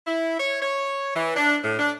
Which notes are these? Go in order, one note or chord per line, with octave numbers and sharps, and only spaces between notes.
E4
C#5
C#5
E3
D4
A2
D4